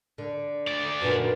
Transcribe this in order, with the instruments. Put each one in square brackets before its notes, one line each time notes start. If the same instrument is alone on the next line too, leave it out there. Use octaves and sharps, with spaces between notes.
[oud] D3
[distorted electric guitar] D2 D5
[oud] F#2 A#2 D3 [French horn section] D#3 F#4 B4